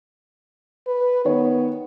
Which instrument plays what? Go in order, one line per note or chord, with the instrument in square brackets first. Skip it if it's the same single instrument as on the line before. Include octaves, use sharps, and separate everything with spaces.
[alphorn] B4
[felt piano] D#3 C#5 [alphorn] B3